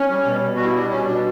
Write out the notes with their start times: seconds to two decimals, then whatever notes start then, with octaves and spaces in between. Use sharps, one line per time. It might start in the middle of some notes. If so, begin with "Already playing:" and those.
Already playing: C#4
0.10 G3
0.26 B2
0.42 B2
0.56 G3 F#4
0.65 E4
0.74 G3 D4
0.91 B2 C#4
1.06 B2 D4